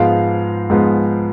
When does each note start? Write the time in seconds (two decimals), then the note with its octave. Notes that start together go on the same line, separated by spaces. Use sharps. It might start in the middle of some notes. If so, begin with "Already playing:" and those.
Already playing: G#2 F3 G#3 B3 F5
0.70 G#2 F3 G#3 B3